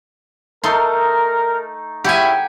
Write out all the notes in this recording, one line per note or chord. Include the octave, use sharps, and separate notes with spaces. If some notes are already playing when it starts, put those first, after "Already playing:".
A3 D#4 A#4 A5 C6
C#3 E4 G4 F#5 G#5